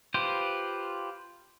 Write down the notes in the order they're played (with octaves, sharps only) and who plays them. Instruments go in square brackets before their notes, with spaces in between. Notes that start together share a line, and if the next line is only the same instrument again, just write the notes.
[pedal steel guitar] F4 G4 B4 C5